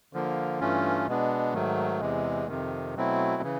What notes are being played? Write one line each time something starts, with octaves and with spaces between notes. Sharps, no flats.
D3 F3 A#3
G2 E3 A3 C#4 F4
B2 G#3 B3 D4
G#2 D#3 F#3 A3
E2 C3 E3 G#3
F2 C3 D#3
B2 F#3 A3 C4 E4
C#3 E3